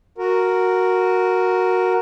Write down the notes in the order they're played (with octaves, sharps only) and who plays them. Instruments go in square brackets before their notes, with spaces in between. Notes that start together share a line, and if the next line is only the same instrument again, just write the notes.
[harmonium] F#4 A#4